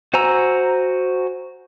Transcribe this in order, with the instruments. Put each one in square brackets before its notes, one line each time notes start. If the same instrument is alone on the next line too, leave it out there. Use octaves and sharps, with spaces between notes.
[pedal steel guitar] F#4 C5 G#5 A#5 E6